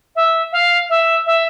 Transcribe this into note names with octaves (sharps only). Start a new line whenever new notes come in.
E5
F5
E5
E5